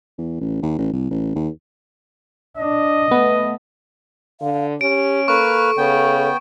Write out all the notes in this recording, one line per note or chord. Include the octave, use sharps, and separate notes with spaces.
E2
A1
D#2
A1
C2
A1
D#2
D4 D#5
A3 B3
D3 F5
C#4 G4 D7
A#3 A4 B4 C#6 F6
C#3 B3 G5